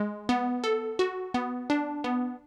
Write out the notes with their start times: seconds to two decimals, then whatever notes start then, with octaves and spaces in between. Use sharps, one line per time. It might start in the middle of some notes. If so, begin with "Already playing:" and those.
Already playing: G#3
0.29 B3
0.64 A4
0.99 F#4
1.34 B3
1.70 D4
2.04 B3